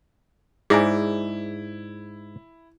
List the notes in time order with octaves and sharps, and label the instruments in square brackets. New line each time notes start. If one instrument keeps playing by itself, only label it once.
[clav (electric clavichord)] G#2 D5 A#5 [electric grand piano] E4 [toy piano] G#4 C5 G#5